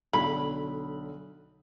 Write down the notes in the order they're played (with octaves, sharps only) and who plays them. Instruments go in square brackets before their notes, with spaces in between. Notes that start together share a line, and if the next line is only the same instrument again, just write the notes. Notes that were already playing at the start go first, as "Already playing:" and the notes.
[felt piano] B1 D3 F#3 [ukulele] B5